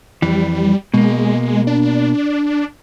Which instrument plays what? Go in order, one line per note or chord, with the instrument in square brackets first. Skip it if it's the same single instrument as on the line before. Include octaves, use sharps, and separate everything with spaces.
[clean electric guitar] F2 E3 [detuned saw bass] G3
[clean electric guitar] B2 A#3 [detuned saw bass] G#3
[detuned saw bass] D4